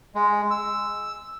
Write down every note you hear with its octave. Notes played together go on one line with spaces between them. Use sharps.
G#3
E6